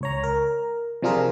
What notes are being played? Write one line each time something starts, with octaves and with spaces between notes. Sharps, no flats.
C#2 C#5 A#5
A#4
C3 F3 D4 F4 G#4 A#4